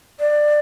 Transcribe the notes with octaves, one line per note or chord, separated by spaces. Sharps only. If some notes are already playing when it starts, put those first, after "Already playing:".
D5